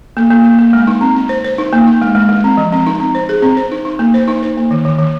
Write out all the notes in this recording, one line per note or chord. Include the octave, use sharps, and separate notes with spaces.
A#3
A#3
A#3
A#3
G#3
D#4
C4
C4
C5
C5
D#4
A#3
D#4
G#3
G#3
G#3
C4
F3
C4
D#4
C4
C5
G#4
C4
C5
D#4
D#4
A#3
C5
D#4
C5
A#3
D#3
D#3
D#3